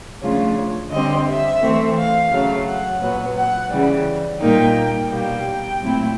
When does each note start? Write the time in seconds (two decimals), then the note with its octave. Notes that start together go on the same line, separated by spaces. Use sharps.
0.21 C#3 F3 A3 D4 F4 C#5
0.92 D3 G3 C4 D#5
1.26 E5
1.61 E3 A3 C4
1.96 F5
2.31 C#3 F#3 A3
2.65 F#5
3.00 A#2 F#3 B3
3.36 F#5
3.70 C#3 E3 G3
4.40 A#2 G3 A#3 D#4 G5
5.10 B2 G3 A#3 G5
5.79 A#2 F#3 A3 C4 E4